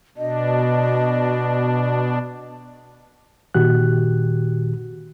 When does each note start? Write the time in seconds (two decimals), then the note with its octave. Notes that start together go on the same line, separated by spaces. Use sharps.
0.18 B2 D4 D#5
3.54 A#2 D#3 F#4 G4 F#6